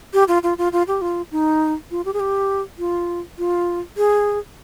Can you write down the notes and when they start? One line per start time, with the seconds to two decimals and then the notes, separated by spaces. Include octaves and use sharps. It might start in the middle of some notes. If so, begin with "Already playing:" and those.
0.14 G4
0.28 F4
0.43 F4
0.58 F4
0.73 F4
0.88 G4
1.01 F4
1.31 D#4
1.91 F4
2.05 G4
2.13 G#4
2.20 G4
2.79 F4
3.38 F4
3.97 G#4